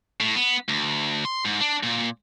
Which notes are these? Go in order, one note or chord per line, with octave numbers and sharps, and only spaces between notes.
A2
B3
D2
C6
G#2
D4
A#2